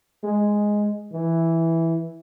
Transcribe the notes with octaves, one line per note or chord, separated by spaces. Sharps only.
G#3
E3